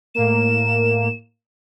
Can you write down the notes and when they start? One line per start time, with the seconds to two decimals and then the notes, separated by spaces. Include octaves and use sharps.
0.15 A2 A#3 E7